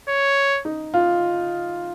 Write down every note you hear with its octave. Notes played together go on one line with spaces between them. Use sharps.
C#5
D#4
F4